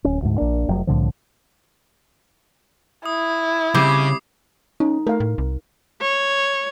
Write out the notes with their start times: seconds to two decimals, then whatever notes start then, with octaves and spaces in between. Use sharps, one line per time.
0.05 D1 C#4
0.22 D2 G#2
0.38 A#1 A#3 D4
0.69 F1 F#3
0.87 C2 A2 D3 F3
3.06 E4 D#6
3.74 C#3 G3 C4 D6 C7
4.80 C#4 D#4
5.07 A3 A#4 F5
5.20 A2
5.38 C2
6.01 C#5